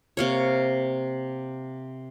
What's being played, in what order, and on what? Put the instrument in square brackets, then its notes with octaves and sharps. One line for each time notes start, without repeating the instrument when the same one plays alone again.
[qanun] C3 A#3 C#5